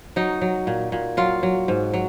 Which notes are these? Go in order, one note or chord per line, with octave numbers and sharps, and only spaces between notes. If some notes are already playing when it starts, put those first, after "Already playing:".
F#3 D#4
F#3
A#2
A#2
F#3 F4
F#3
G#2
F#3